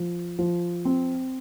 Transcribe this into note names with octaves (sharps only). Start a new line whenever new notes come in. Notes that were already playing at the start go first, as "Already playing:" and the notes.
Already playing: F3
F3
C4